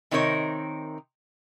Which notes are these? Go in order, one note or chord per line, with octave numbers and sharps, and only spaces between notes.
C3 D#3 C4 D#4 A#4 C#5